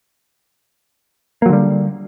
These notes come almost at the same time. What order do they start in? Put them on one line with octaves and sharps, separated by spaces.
A#3 F#3 D3 G3